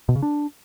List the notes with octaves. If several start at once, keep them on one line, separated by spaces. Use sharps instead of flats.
B2
C#3
D4